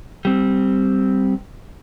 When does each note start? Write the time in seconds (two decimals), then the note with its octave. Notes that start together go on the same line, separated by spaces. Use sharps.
0.25 G3 C4